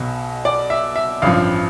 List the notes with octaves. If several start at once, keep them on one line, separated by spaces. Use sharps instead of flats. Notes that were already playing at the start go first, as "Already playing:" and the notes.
Already playing: B1 B2
D5
E5
E5
A1 G2 F3 F5